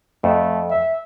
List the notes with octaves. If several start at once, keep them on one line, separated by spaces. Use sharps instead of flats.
F2 A3
E5